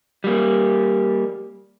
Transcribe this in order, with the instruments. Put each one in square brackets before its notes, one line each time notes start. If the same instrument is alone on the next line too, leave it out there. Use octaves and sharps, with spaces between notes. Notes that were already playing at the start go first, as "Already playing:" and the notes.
[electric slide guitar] G3 A#3